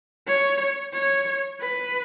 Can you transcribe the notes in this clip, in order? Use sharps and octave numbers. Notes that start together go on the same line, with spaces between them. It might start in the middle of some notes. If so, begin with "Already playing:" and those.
C#5
C#5
B4